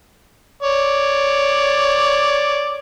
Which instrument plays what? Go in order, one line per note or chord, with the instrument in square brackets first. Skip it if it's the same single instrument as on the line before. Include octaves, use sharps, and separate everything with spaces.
[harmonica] C#5 D5